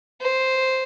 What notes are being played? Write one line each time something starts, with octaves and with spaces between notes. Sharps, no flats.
C5